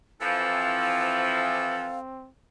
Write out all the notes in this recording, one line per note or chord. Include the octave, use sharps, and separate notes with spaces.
E3 F3 C4 A4 F5